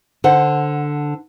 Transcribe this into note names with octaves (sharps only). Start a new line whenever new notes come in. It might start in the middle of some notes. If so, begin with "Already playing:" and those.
D3 C5 F#5